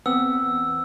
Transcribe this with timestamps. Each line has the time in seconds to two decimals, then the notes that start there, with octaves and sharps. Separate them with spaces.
0.06 E2 B3 C4 F#5 E6